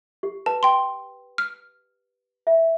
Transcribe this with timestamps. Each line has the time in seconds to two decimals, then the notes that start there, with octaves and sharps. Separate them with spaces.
0.23 G4
0.46 B4 A5
0.63 G5 C6
1.38 F6
2.47 E5